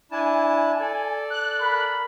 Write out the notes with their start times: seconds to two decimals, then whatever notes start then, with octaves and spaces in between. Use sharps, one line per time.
0.11 D4 E4 G#5 A5
0.80 A4 D5
1.30 F#6
1.61 A#4 B5